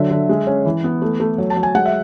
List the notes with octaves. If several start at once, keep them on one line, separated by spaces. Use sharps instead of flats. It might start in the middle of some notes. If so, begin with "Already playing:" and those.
Already playing: D3 F#3 E5
D3
G#3
C#4
E3
B3
A3
A3
F#3
A5
F#3
G#5
G#3 F#5
E5